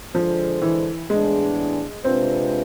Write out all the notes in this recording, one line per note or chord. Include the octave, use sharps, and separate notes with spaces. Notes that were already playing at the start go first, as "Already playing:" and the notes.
D3 F3 G#3 D4 A4 C5
E3
A2 E3 G#3 B3 D4 G#4
C3 G#3 C4 D4 F4 B4